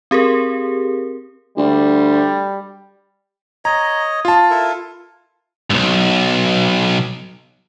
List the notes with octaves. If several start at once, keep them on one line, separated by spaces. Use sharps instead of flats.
C4 G4 G#4 A#4
D2 G3
C#5 D#5 A#5
F4 A5
E4 A4 A#4
B1 G2